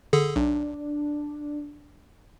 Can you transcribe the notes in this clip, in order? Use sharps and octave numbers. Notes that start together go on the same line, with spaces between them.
D3 G#4 A4
B1 D4